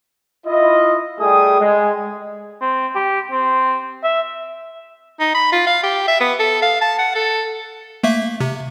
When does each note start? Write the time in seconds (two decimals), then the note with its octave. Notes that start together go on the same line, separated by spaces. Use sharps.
0.47 E4 F4 D#5
1.20 G3 A3 G#4 G5 G#5 D#6
1.60 G#3
2.61 C4
2.95 G4
3.31 C4
4.04 E5
5.20 D#4
5.34 B5
5.52 F4
5.67 F5
5.83 G4
6.08 E5
6.21 B3
6.40 A4
6.62 F5
6.81 A5
6.99 F#5
7.15 A4
8.03 A3 A#3 E5
8.40 C3